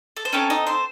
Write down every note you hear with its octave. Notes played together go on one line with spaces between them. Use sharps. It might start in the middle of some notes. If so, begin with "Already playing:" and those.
A4
C5
C4 C#4 D#4 A4 C#5
D#4 D#5
C5 C6